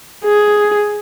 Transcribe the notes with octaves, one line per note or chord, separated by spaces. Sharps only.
G#4